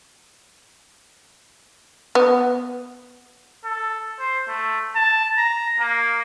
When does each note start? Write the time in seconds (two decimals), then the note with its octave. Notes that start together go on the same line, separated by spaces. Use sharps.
2.15 B3
3.64 A4
4.19 C5
4.48 A3
4.95 A5
5.37 A#5
5.80 A#3